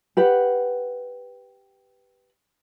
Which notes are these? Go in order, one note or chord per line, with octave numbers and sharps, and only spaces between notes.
G4 B4 F#5